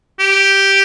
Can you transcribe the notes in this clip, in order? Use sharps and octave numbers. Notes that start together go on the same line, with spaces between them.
G4